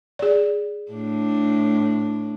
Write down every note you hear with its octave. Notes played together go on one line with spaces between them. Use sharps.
G#4 D5
A2 D4